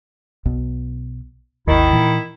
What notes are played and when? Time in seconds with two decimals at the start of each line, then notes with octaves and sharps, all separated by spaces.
0.45 B1 B2
1.67 G#1 D#2 D#3 E4
1.92 A#2 E3